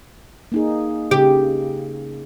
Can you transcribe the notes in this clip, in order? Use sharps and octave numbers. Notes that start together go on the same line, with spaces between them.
A#3 D#4 G#4
C#3 G4